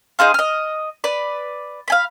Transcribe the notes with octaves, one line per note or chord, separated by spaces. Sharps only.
D#4 G#4 C5 F5
D#5 F6
B4 D5
F5 G#5 B5